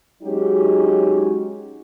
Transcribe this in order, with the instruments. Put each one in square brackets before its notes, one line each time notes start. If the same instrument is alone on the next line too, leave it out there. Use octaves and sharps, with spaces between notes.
[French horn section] F#3 G#3 C#4 D#4 F#4 G4